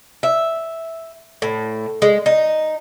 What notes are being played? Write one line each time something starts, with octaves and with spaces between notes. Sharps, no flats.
E5
A2
G#3
D#4